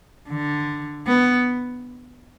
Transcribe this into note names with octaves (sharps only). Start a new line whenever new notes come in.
D3
B3